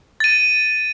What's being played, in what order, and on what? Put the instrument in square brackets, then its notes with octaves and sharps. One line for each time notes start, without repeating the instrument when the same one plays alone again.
[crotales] A6 D#7